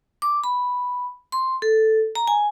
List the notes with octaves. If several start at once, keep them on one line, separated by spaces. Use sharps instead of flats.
D6
B5
C6
A4
A#5
G#5